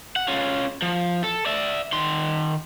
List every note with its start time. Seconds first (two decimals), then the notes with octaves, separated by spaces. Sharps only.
0.16 F#5
0.28 C#4 F4
0.82 F3
1.24 A4
1.46 D5 E5
1.93 D#3 C6